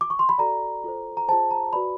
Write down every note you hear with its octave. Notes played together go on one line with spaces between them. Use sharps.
D6
C#6
C6
B5
F#4 A4 D5 A#5
F4 A4 C5
A#5
F4 G#4 C5 A5
A#5
F#4 B4 D5 B5